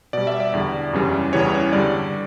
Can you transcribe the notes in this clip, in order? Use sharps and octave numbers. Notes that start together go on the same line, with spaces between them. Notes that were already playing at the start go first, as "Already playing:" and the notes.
B2 G3 D5
E5
D5
E2 D3 G3
F#2 C#3 E3 G3
E2 C#3 E3 G3 C#5
G2 D3 G3 D5